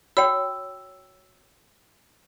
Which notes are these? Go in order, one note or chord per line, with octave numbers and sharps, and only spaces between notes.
F#4 C#5 G5 E6